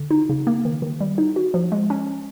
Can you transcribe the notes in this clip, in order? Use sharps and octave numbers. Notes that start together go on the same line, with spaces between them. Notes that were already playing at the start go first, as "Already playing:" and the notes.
Already playing: D3
D#4
C#3
A#3
D#3
D#3
G3
D#4
F#4
F3
G#3
C#4